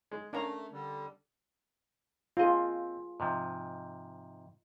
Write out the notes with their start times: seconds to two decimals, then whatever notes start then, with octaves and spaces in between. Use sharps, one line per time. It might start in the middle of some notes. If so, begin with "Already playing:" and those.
0.12 G#3
0.33 A3 C#4 D4 A#4 F5 A#5
0.72 D3 G3
2.37 C4 F4 G#4 D#5
3.20 G#2 C3 F3